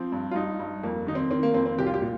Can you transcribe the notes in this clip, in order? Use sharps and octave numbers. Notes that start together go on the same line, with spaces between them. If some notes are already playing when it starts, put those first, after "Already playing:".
Already playing: F3 C4
G2
F4
G2 D#4
G2
F2 A#3
D#3 D#4
C4
D#3 C4
A#3
F2 C4
C4
C2 G4
F4
G4
A#2